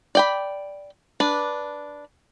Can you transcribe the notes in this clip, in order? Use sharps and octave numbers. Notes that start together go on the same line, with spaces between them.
D5 G5 B5
D4 B4